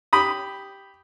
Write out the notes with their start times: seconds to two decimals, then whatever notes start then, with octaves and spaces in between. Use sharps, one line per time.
0.13 G4 B5 D#6